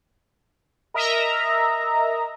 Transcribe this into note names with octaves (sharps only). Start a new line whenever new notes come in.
A#4 D#5 E5 A#5